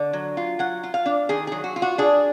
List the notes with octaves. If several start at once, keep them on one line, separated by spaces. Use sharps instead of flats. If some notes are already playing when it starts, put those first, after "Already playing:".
Already playing: D3
F#3
F4
F#3 F#5
F4
F5
D4
D#3 G#4
F#3 G#4
F#4
F4
F#4
D4 G#4